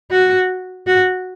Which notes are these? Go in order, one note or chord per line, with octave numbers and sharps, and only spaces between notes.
F#4
F#4